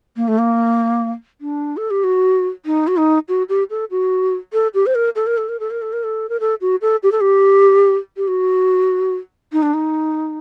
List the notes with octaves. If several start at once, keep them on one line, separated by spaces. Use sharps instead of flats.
A#3
A3
A#3
D4
A4
G4
F#4
D#4
F#4
D#4
F#4
G4
A4
F#4
A4
G4
C5
A#4
A4
A#4
A4
A#4
A4
A#4
A4
A#4
A4
A#4
A4
F#4
A4
G4
A4
G4
G4
F#4
D#4
D4
D#4